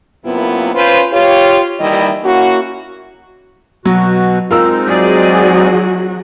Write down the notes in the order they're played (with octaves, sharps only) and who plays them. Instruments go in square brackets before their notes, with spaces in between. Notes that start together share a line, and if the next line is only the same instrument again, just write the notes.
[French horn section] F#2 C3 A#3 B3 E4 F4
C#4 F4 B4 C5
F4 G4 C#5
D#2 D#3 E3 G3 E4 D#5
A#3 C#4 E4 F#4
[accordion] B2 F#4 [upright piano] F#3
[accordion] G#3 C4 D#4 [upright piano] F4 A#4 E6
[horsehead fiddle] F#3 F#4 [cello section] G#4 D5